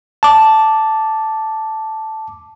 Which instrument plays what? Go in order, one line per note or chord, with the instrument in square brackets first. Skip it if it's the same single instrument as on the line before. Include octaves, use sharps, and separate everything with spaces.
[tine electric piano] A5 D6